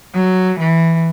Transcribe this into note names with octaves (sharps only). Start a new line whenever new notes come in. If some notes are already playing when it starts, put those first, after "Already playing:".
F#3
E3